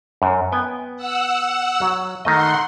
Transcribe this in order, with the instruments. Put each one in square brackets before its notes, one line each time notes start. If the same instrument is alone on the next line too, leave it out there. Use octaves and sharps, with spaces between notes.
[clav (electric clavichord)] F#2
B3 G5 G#5
[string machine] F#5 E6
[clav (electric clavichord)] F#3
[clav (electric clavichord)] D#3 A3 D#5 [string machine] F#5 C6